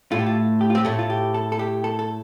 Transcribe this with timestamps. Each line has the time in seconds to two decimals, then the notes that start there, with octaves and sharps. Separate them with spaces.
0.12 A2 A3 F4
0.19 G4
0.26 F4
0.61 G4
0.70 F4
0.75 C4 G4
0.85 A2 A3 A4
0.99 F4
1.10 G4
1.34 A4
1.52 A4
1.59 G4
1.84 A4
1.99 A4